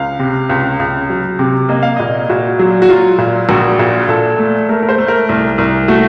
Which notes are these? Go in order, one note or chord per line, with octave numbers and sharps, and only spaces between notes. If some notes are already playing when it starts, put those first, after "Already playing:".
Already playing: C#2 F5
C3
C#2
C#2
F#3
C3
A#3 D#5
F5
A#2 D#5
A#2 F#4
F#3
F#4
F#3 F4
A#2
A#1 F#4
A#2
A#2 A4
A3
A3 A#4
A#4
C5
A3
A#4
C2
C2
A3 F#4